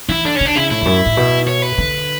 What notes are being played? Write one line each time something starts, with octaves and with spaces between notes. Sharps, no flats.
E3 E4
D3 D4
C#4
D3 D4
C#3 E4
A2 E4
E2
F#2
A2
B2
C#5
B4
D3